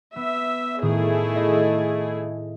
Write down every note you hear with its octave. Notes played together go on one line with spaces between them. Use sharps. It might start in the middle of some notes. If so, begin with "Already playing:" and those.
B3 E5
A2 D#3 A3 E4 G#4 D#6
D#5 E5 C7